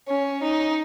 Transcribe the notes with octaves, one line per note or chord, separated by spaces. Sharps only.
C#4
D#4